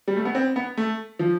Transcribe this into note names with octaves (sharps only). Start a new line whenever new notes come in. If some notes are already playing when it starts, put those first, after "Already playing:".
G3
A3
B3
C4
B3
A3
F3